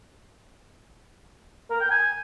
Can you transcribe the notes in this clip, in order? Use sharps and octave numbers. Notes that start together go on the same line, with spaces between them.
A#4
G5
G#5